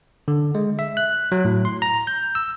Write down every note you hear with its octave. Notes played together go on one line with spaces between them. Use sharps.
D3
G#3
E5
F#6
F#3
A2
C6
A#5
G6
E6